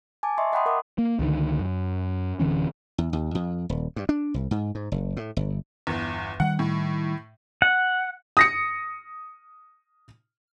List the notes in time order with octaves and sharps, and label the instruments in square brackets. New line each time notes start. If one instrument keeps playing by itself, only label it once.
[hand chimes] G#5 A5 D6
D#5 E5 A5 C6 C#6
D#5 F#5 G5 B5 C6 D#6
A#4 F#5 D6 D#6
[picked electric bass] A#3
C#2 D3 D#3
F#2
D1 D3 E3 C#4
[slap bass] E2
D#2
F2
D#1
G2
D4
C2
G#2
G#2
F#1
A2
G1
[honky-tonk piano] G1 E2
[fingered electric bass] D#3 G3 [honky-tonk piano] F#5
[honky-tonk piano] A2
[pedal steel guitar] F#5
[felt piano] D#6 A#6 C#7